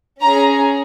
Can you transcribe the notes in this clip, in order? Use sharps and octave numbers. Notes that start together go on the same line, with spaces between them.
C#4 G#4 A#5